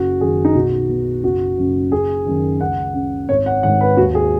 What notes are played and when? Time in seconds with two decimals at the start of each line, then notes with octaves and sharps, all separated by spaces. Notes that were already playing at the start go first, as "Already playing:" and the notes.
Already playing: F#1 F#4
0.21 F#2 D#3 G#4
0.45 D#4
0.55 B1 F#4
0.89 B2
1.23 F#1 F#4
1.58 F#2 C#3
1.92 F#1 G#4
2.26 F#2 D#3
2.60 C#2 F#5
2.94 C#3
3.29 G#1 C#5
3.46 F#5
3.63 G#2 D#3 F#5
3.81 B4
3.97 D#2 F#4
4.15 G#4